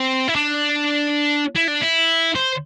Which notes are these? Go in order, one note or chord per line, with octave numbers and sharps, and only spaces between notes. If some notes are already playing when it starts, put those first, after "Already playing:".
Already playing: C4
E4
D4
E4
D4
E4
C5